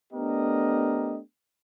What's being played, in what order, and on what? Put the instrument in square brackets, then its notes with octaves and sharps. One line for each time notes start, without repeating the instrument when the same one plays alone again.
[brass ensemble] A3 B3 D4 G4 A#4 D#5